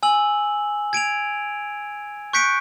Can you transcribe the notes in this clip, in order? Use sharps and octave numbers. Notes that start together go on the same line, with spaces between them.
G#5 E6 F#7
G#6 D7 D#7 F7
C#6 F#6 G6 B6 C#7 D7